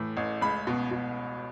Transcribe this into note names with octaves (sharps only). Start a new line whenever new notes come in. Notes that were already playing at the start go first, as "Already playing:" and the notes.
Already playing: A2 E3
A1
C#2 B5
B2
B2